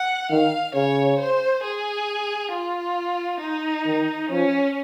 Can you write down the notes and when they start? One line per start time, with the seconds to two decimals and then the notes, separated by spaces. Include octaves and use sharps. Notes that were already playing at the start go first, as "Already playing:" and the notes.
Already playing: F#5
0.31 D#3 F5
0.75 C#3 C#5
1.19 C5
1.64 G#4
2.53 F4
3.41 D#4
3.86 D#3
4.29 F3 C#4